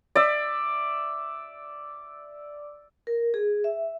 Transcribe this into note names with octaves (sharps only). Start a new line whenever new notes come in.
D5 E5
A#4
G#4
E5